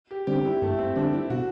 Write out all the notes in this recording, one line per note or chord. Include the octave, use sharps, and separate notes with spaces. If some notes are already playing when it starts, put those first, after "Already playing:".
G4
D3 G3 C4 G4
E4
G2 A3
C4
D3 G3 C4 D4
E4
B2 F#4